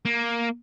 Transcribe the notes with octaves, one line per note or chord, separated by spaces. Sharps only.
A#3